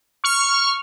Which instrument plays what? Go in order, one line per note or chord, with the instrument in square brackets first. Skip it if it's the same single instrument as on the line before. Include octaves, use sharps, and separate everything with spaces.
[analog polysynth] C#6 F6